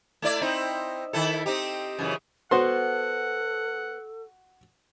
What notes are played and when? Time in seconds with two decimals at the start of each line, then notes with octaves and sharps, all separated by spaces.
0.22 A3 E4 D5
0.41 C4 D#4 E4
1.13 D#3 E4 A4
1.46 C4 D#4 G4
1.99 F#2 C#3 E3
2.51 B3 F#4 A4 C5 F#5 C6